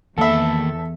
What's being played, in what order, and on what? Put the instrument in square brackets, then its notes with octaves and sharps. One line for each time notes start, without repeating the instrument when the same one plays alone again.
[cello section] E2 [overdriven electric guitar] D#3 B5 [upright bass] A#3 [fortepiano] A4 E5